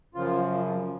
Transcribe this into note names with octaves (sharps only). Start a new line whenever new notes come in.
F#2 C#3 F3 F4